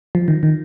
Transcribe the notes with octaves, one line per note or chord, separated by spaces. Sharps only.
F3
D#3
D#3